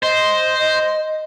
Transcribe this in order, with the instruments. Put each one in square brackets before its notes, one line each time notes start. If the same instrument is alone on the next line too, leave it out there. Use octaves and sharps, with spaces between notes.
[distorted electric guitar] C5 [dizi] D#5